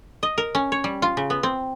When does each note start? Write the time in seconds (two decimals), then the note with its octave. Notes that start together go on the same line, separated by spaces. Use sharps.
0.23 D#5
0.38 A#4
0.55 C#4
0.72 C#5
0.84 G3
1.02 F4
1.17 C#3
1.30 B3
1.43 C4